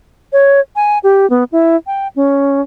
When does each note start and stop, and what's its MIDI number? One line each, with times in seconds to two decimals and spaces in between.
0.32 0.60 73
0.76 0.98 80
1.03 1.28 67
1.30 1.44 59
1.52 1.76 64
1.86 2.08 79
2.16 2.61 61